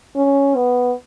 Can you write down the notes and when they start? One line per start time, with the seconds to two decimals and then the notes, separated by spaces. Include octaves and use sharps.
0.16 C#4
0.55 B3